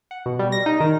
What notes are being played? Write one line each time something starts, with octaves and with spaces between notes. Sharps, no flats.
F#5
B2
G3
A#6
D#4
D#3